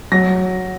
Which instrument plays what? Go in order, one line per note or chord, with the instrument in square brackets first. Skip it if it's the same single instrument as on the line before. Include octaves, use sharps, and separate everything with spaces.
[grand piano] F#3 A#6